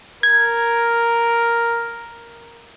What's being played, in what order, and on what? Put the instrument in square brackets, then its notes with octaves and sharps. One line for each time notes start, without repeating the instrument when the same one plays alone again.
[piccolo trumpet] A#4 [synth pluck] G#6